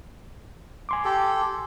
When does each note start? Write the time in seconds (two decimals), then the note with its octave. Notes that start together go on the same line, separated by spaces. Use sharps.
0.89 G#5 C6 D6
1.05 G4 A4